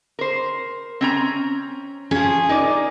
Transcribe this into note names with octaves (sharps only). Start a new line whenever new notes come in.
A#4 C5
C4 C#4 A#5
F3 C#4 G#4
D#4 A#4 D5